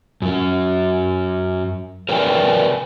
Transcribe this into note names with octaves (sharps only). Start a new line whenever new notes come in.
F#2 F#3
A#4 B4 C#5 D5 G5 G#5